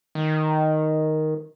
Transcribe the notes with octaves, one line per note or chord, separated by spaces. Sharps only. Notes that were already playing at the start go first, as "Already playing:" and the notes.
D#3